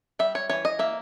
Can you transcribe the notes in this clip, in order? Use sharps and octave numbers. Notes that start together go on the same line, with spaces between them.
G3 E5
C#5
E3 C#5
D#5
A#3 E5